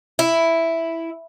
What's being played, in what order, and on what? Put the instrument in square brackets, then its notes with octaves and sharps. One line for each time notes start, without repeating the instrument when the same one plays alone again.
[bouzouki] E4